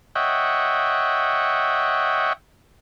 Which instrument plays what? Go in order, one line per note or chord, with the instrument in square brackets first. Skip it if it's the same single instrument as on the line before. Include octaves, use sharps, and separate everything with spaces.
[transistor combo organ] C#5 D#5 E5 F#5 G5